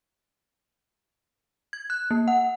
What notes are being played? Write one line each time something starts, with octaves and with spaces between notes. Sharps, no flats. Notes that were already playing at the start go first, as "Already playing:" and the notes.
G#6
F#6
A#3
F#5